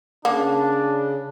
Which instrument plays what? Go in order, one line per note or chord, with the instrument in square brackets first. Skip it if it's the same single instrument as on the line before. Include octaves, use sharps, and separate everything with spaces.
[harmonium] C#3 [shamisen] A#3 [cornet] D4